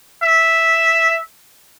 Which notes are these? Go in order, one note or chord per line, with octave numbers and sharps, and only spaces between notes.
E5